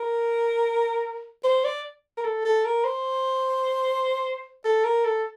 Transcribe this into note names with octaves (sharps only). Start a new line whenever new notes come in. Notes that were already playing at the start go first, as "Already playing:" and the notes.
Already playing: A#4
C5
D5
A#4
A4
A4
A#4
C5
A4
A#4
A4